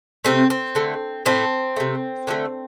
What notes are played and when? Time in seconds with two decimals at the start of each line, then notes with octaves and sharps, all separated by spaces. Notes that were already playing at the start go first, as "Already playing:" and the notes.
0.25 C3 A3 C4
0.50 C4
0.75 D3 A3
1.26 A2 A3 C4
1.76 C3 A3
2.27 D3 F3 A3